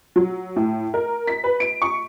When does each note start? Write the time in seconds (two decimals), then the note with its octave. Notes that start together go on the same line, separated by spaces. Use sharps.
0.16 F#3
0.56 A2
0.94 A#4
1.27 B6
1.44 B4
1.60 D7
1.82 C#6